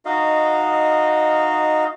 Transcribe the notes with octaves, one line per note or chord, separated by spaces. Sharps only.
D#4 F#4 D#5 F5